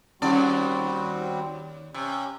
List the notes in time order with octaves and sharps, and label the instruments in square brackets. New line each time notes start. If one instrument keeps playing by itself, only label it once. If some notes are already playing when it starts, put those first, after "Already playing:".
[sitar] D#2 D5 [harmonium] G3 C4 F#4 [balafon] C#4
[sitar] C3 [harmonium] C#4